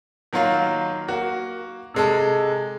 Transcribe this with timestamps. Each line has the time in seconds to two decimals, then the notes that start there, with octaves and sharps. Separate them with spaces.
0.33 D#3 F#3 A#3 F4
1.08 A#3 F#4
1.94 C3 G#3 A4